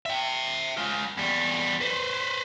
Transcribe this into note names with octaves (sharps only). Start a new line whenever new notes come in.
E5 G5
G#3 F4
E2 G3
B4 C5